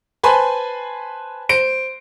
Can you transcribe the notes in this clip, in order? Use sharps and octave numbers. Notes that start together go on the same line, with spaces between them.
B4 C5 G#5 A5 B5 C6
C5 D7